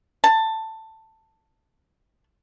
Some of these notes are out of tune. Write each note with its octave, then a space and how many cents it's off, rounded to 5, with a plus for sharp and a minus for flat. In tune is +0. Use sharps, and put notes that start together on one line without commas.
A5 +10